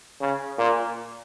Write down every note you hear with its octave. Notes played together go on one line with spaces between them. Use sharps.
C#3
A#2